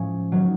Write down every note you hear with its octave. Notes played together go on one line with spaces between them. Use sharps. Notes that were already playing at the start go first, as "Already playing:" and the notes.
Already playing: A2 F3 G#3 C#4
D#3 F#3